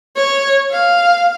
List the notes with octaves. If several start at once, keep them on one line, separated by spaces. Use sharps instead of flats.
C#5
F5